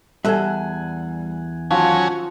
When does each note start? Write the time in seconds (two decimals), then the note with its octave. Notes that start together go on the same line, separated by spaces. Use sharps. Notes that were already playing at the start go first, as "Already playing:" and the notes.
0.25 E2 G3 A4 E5 F#5 G#5
1.71 D#3 F3 F#3 C#4 G#5